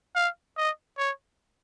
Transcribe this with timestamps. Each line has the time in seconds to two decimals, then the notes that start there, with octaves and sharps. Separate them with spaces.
0.15 F5
0.58 D#5
0.98 C#5